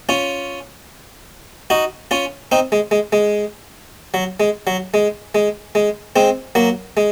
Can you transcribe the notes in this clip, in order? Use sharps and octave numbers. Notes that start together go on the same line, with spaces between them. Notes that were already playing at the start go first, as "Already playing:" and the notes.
C#4 F4
D#4 F#4
C#4 F4
C4 D#4
G#3
G#3
G#3
F#3
G#3
F#3
G#3
G#3
G#3
G#3 C4
F#3 A#3
G#3